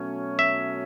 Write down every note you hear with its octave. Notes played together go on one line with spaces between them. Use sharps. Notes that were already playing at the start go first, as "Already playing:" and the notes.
Already playing: B2 F#3 A3 C#4
E5